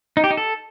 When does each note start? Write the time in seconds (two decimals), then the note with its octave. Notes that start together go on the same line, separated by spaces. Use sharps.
0.17 D#4
0.24 G4
0.31 D#4
0.37 A4